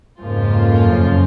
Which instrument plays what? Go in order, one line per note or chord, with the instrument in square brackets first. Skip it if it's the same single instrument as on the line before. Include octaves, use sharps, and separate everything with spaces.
[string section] F2 C#3 F3 A#3 F4 [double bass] G#2
[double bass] F#2